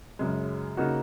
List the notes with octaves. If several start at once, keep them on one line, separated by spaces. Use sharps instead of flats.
F#2 C#3 G#3
C#3 A#3 D#4 F#4